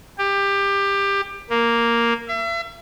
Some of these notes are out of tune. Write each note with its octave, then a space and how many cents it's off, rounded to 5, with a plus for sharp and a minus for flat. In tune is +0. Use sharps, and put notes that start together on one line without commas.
G4 +20
A#3 +0
E5 +40